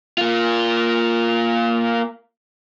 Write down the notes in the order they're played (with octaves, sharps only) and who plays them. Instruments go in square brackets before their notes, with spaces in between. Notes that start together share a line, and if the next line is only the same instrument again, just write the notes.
[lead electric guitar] A#3 F4